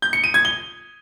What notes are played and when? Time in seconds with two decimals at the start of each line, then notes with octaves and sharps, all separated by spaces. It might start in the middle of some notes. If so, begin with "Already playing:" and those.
0.02 G6
0.13 C#7
0.24 D#7
0.34 G#6
0.45 G7